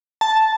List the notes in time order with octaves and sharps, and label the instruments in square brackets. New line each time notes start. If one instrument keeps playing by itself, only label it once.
[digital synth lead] A5